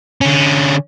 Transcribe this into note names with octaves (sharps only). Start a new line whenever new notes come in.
D3 C#4